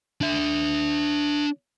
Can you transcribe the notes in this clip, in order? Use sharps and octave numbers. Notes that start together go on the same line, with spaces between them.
D4 E5